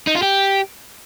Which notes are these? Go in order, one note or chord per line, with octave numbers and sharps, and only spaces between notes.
D#4
F4
G4